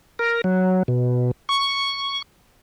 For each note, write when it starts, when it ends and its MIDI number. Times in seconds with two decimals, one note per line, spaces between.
0.19 0.41 70
0.44 0.83 54
0.88 1.31 47
1.49 2.22 85